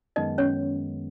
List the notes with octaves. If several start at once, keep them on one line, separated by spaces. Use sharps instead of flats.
F#2 D#3 G#3 B3 D#4 D#5
C#4 C#5